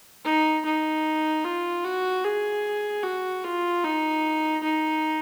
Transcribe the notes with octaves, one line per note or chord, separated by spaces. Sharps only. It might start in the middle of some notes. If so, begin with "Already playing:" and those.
D#4
D#4
F4
F#4
G#4
F#4
F4
D#4
D#4